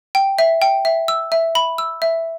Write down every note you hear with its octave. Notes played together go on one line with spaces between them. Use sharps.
G5
E5
G5
E5
E6
E5
B5
E6
E5